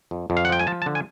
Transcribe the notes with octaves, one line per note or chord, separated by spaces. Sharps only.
F2
F2
F5
F#5
F3 G5
G#5
F3 A5
A5
D3
G#5